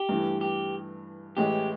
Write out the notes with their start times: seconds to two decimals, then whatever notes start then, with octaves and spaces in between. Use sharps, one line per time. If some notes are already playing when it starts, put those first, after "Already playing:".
Already playing: G4
0.09 G2 E3 A3
0.41 G4
1.37 A1 A2 E3 G#3 G4